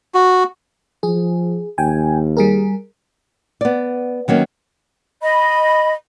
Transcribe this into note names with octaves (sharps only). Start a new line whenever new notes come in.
F#4
F3 G#4
D#2 G5 G#5
G3 G#4 A#4
B3 D5
D#3 F#3 A#3 C#4
D#5 B5